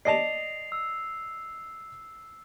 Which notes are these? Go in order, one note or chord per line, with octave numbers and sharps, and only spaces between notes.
D5 D#5 A5 C7 F7
E6